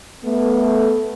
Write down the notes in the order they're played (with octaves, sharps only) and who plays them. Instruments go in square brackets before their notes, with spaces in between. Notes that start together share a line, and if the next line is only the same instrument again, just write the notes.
[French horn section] A3 B3